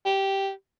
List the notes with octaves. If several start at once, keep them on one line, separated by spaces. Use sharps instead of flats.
G4